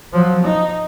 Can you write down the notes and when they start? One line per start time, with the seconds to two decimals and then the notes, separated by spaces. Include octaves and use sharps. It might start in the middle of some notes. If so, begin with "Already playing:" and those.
0.13 F3 F#3
0.43 D#4